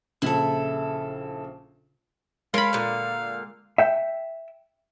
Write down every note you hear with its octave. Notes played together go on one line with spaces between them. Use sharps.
A#1 C#3 E4 A4
G#3 A#4 C#5 F5 A5 B5 C6
A#2 D3
E5 G5